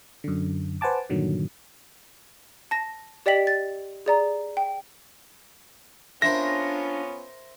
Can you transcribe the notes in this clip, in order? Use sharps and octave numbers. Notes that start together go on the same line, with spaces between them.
F#2 D3
B4 C5 F#5 G#5 A5 D6
G2 A#2 D3 D#3 F#3
A5 A#6
G4 D5 D#5 G5 B6 F#7
A6
G#4 D5 A#5
G5
B3 C#4 D4 F4 A#4 C5 E5 A#6